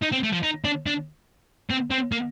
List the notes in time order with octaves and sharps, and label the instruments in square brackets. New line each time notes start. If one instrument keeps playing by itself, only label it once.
[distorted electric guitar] D#4
C4
A3
F3
D#4
D4
D4
C4
C4
A#3